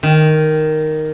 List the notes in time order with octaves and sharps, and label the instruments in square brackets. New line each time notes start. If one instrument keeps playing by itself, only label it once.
[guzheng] D#3